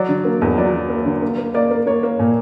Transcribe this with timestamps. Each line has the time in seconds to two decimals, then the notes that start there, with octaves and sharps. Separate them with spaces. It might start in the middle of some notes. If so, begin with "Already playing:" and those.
Already playing: F#3 D5
0.08 D3
0.25 A#3
0.42 E2
0.57 F#3 D5
0.73 F#3
0.90 A#3
1.05 D3
1.22 A#3
1.38 A#3
1.54 A#3 D5
1.71 A#3
1.87 A#3 C#5
2.03 A#3
2.19 A#2